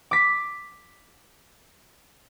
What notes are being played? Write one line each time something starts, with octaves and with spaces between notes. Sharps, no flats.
D6 B6